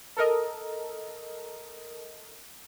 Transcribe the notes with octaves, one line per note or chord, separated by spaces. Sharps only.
A4 A#4 D#5